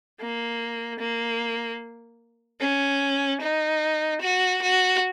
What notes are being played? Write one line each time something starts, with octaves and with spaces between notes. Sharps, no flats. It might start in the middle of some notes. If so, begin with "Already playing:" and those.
A#3
A#3
C#4
D#4
F#4
F#4